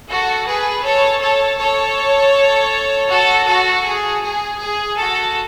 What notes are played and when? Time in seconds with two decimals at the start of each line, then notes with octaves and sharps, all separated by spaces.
0.09 F#4 A4
0.47 G#4 B4
0.85 A4 C#5
1.22 A4 C#5
1.59 A4 C#5
3.10 F#4 A4
3.47 F#4 A4
3.85 G#4
4.22 G#4
4.60 G#4
4.97 F#4 A4